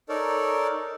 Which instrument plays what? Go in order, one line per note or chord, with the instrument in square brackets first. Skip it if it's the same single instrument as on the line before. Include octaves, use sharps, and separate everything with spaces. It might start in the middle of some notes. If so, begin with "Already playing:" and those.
[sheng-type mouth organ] D#4 A4 A#4 C#5 D5